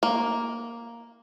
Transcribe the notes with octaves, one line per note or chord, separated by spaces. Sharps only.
A#3